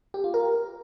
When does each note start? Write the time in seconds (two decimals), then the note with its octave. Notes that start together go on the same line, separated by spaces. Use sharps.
0.14 G4
0.24 F4
0.34 A#4